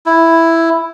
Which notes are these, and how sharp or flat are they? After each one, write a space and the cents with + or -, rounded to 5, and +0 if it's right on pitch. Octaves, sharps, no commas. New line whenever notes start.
E4 +0